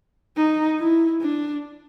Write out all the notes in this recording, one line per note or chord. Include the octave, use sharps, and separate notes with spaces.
D#4
E4
D4